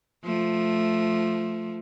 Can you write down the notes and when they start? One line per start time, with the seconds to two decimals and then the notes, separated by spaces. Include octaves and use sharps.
0.25 F3 A3